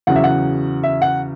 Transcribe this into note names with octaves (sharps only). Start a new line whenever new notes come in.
E2 C#3 F#3 F#5
E5
F#5
E5
F#5